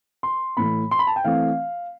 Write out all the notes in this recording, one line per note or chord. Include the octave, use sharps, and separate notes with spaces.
C6
A2 E3 A3 B5
C6
B5
A5
G5
E3 A3 C4 F5